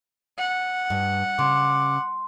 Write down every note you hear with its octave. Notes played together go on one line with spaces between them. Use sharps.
F#5
G2
C#3 C6 D6